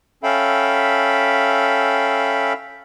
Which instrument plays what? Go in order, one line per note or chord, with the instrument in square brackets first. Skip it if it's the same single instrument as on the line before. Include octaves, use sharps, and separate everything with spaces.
[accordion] C#4 A4 E5 F5 G5 B5